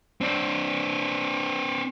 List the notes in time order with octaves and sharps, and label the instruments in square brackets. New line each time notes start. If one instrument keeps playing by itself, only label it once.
[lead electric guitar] C4 D4